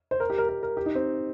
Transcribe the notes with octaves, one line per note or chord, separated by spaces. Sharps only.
C5
A#4
G4
A#4
A#4
A#4
G4
D#4
C4